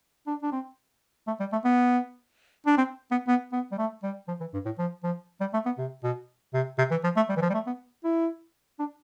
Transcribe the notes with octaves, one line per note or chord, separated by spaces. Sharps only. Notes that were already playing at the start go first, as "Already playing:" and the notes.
D4
D4
C4
A3
G3
A3
B3
D4
C4
B3
B3
B3
G3
A3
G3
F3
E3
G2
A2
F3
F3
G3
A3
B3
C3
B2
C3
C3
E3
F3
A3
G3
E3
F3
G3
A3
B3
E4
D4